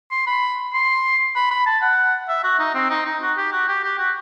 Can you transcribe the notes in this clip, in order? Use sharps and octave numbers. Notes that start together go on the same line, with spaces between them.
C6
B5
C6
B5
B5
A5
F#5
E5
F#4
D#4
C4
D#4
D#4
F#4
G4
F#4
G4
G4
F#4